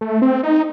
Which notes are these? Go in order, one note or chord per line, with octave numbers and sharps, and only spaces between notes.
A3
C4
D#4